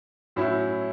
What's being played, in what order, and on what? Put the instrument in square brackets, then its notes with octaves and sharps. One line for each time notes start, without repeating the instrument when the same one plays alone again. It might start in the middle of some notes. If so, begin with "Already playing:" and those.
[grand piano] A2 F#3 C#4 E4